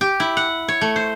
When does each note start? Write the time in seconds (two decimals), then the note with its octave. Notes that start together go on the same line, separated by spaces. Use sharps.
0.01 G4
0.20 E4
0.37 F#5
0.68 C#5
0.81 A3
0.96 C5